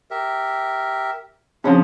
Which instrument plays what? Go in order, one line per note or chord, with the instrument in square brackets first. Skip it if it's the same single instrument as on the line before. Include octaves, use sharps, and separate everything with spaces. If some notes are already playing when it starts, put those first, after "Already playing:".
[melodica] G4 A#4 E5
[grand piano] C#3 F3 [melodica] F#3 F#5 [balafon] C4 D4 C#5